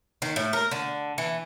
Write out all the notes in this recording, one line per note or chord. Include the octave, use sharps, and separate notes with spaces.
D#3
A2
A#4
D3
E3